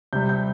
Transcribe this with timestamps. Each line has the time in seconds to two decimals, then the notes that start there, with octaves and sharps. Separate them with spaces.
0.13 C3 G3 G6
0.29 G6